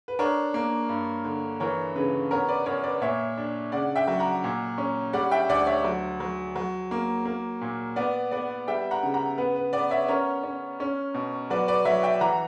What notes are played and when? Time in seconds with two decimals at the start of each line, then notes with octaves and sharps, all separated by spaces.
0.08 B4
0.19 D4 A#4 C#5
0.54 A#3
0.89 G2
1.24 D3
1.60 E3 A#4 C#5
1.95 C#3 B4
2.31 B3 A#4 C#5
2.49 B4 D5
2.66 F#2 A#4 C#5
2.83 B4 D5
3.01 A#2 C#5 E5
3.38 D4
3.72 C#3 D5 F#5
3.96 E5 G5
4.08 F#3
4.19 F#5 A#5
4.44 A#2
4.78 C#4
5.13 G3 D5 F#5
5.31 E5 G5
5.49 D2 D5 F#5
5.67 C#5 E5
5.84 F#3
6.20 F#3
6.56 F#3
6.91 A#3
7.25 A#3
7.61 A#2
7.96 B3 B4 D5
8.31 B3 D5 F#5
8.68 G3 E5 G5
8.91 F#5 A#5
9.03 C#3
9.14 F#5 A#5
9.38 B3 B4
9.56 B4
9.73 B3 B4 D5
9.91 C#5 E5
10.08 C#4 A#4 C#5
10.44 C#4
10.80 C#4
11.14 B2
11.50 F#3 B4 D5
11.68 B4 D5
11.85 F#3 C#5 E5
12.03 E5 G5
12.20 E3 F#5 A#5